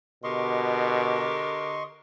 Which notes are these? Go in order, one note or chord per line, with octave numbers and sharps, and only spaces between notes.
B2 D3 G4 A#4 D#5 C6 C#6